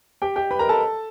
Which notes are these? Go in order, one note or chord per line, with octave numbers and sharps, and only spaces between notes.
G4 G5
G4 G5
B4 B5
A#4 A#5
A4 A5